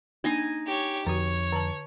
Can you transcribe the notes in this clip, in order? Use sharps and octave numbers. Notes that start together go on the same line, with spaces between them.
A#3 D4 D#4 D#5 G#5
G4 C#5
F2 D3 F#4 C#5
D3 A5